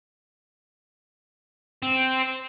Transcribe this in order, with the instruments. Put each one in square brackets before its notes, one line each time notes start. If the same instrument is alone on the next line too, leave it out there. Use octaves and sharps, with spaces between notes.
[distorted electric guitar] C4